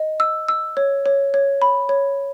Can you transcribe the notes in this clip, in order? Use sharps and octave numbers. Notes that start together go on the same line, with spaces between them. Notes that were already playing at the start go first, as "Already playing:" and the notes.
Already playing: D#5
E6
E6
C#5
C#5
C#5
B5
C#5